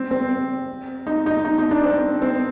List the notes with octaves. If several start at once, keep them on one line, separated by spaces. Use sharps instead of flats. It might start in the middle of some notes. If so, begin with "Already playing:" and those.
Already playing: C4
C4
D#4
D#4
D#4
D#4
D4
C4
C4